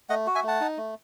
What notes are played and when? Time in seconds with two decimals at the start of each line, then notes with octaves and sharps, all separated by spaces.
0.09 A3 D#5 F#5
0.27 F#4
0.35 E5 G#5
0.43 A3 F#5 A5
0.61 D#4
0.77 A3